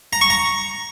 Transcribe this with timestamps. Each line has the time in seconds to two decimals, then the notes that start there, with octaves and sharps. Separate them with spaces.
0.13 A#5
0.21 C#6
0.30 A#5